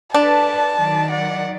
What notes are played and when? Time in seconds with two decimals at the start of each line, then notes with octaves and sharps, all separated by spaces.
0.14 D4 A4 B4 D5 A5
0.77 D#3 F#3 D5
1.11 F#5